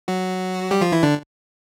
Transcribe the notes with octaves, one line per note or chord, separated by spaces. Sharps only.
F#3 F#4
G3 G4
F3 F4
E3 E4
D3 D4